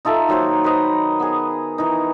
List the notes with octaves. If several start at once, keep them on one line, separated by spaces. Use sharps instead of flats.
D#4 F4 A4 E5
D#3 F#3 A#3 C5
B4 C5 D#5
B3 G#4
E3 D#4